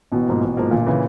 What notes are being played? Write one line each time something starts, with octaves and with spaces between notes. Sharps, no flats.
A1 B2
G#2 F3 A#3
A1
G#2 F3 A#3
G1 A#2
C#3 E3